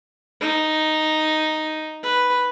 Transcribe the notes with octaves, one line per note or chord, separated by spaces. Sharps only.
D#4
B4